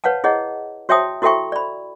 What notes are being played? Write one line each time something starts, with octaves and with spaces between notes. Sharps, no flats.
B4 C#5 F5 F#5 A5
E4 G#4 C#5 D#5 F#5
F#4 C#5 E5 G5 A5 D#6
E4 F#4 A4 E5 G5 C#6
D5 B5